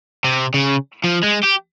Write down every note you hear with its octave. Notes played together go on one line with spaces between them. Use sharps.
C3
C#3
F3
G#3
G4